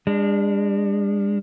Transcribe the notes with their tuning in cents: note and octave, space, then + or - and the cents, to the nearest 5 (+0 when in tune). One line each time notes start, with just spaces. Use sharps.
G#3 -45 D4 +0